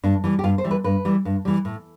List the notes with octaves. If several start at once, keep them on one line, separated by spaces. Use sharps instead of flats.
G2 D4
E3 G3
G4
G2 F4
C5
E3 G3
B4
G2 B4
E3 G3
G2
E3 G3
A2